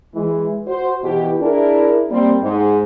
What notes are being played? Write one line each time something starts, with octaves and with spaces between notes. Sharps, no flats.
E3 G#3
F#4 C5
B2 E3 G4
D4 E4 G#4 A#4
G3 A#3 C4
G#2